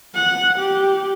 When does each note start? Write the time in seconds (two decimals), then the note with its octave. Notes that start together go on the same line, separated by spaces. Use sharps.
0.15 F#5
0.59 G4